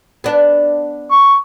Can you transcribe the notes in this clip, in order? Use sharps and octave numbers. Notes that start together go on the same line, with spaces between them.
B3 D4
C#6